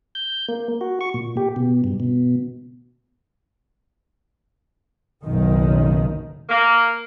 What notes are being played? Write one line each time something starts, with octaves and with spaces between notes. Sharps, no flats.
G6
A#3
F#4
C#6
A#2
G4
B2
G2
B2
F#1 B1 D#3
A#3